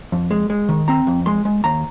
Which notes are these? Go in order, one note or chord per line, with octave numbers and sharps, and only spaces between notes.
F2
G#3
G#3
D#3
C4 A#5
F2
G#3 C6
G#3
D#2 A#5